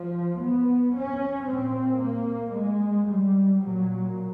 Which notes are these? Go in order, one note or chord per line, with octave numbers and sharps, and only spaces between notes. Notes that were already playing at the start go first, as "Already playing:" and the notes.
Already playing: F3
B3
C#4
A#2 C4
A#3
G#3
G3
A#2 F#3